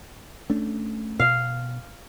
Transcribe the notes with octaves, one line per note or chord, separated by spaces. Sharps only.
A3 C#4 D4
B2 F5